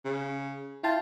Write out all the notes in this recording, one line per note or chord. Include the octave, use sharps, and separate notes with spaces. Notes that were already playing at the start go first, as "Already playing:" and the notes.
C#3
E4 F4 G5 A5